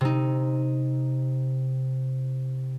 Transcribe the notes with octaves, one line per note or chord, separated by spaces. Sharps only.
C3 D#4